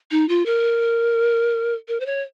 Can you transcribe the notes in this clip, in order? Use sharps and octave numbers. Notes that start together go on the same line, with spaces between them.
D#4
F4
A#4
A#4
C5
C#5